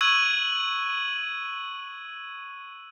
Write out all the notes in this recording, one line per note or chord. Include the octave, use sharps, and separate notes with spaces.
C#6 E6 F#6 G#6 D#7 F#7